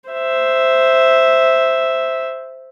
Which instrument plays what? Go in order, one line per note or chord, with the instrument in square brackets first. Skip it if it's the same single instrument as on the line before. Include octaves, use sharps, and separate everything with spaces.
[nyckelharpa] C5 E5